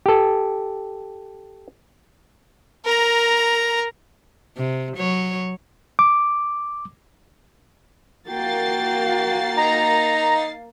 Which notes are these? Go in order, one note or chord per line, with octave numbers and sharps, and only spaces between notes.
G4 A4
A#4 A#5
C3
F#3 C#5
D6
A#3 F#4 G5 A6 C7
D#4 A#5